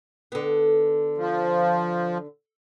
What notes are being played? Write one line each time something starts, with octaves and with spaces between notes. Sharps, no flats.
D3 B3
F3